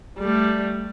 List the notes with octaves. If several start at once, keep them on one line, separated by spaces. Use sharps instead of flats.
G3 A3